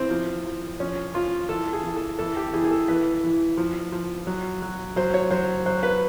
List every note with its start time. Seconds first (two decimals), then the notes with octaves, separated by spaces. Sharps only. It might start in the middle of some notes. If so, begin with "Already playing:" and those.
Already playing: E3 C4
0.11 F3
0.45 F3
0.80 F3 C#4
1.14 F3 F4
1.49 E3 A4
1.73 G#4
1.84 E3
1.96 A4
2.19 E3 A4
2.36 G4
2.53 E3 G#4
2.65 G#4
2.71 A4
2.88 E3 B4
3.24 E3
3.57 F3
3.92 F3
4.27 F#3
4.62 F#3
4.96 F#3 C5
5.14 C#5
5.31 F#3 C5
5.66 F#3 C5
5.83 B4